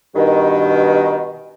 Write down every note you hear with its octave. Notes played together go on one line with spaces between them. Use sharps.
G2 B2 D#3